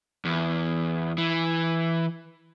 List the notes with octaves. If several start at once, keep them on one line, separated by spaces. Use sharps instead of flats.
E2
E3